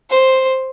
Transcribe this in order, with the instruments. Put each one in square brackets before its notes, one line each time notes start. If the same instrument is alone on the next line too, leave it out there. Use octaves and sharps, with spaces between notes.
[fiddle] C5